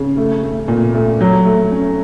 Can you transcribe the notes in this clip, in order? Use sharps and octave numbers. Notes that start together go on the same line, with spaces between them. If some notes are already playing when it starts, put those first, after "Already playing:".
Already playing: C#3
A3
A3
A#2
A3
F#3
A3
C#4